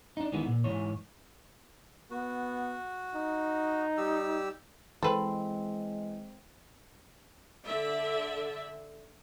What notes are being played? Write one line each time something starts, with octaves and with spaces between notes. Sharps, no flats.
D4 D#4
C#2 D#3 E3 G#3 B3
A#2
G#2 E3 C#5
B3 F#4
D#4
G3 G4 E6
E3 G#3 C4 A4 B4
D3 D5 E5